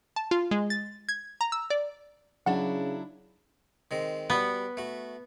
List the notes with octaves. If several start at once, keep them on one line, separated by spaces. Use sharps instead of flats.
A5
F4
G#3
A6
G#6
A#5
E6
D5
C#3 F#3 D4 E4 F#5
D#3 G#3 C4
G3 B3 F#4 F#5
A3 F#4